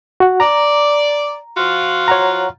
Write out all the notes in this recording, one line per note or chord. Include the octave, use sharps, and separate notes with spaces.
F#4 F#5
D5 A#5
F3 F4 F#4
C#5 F#5 A#5